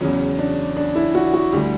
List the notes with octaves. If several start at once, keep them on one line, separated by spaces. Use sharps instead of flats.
E2 C#3 F#3 C#4
D4
D4
E4
F#4
F#4
D2 D3 G3 G4